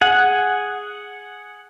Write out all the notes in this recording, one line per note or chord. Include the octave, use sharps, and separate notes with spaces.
G#4 F#5